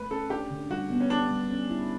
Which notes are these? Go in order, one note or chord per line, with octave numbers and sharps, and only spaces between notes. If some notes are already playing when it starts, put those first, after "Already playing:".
Already playing: A3 B4
C#4 A4
D4 G4
D3
G3 F#4
B3
C#4
D4 G4
G3
C#4
E4